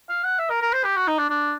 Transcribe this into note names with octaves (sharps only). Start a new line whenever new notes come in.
F5
F#5
E5
A#4
A#4
C5
G4
F#4
D#4
D4
D4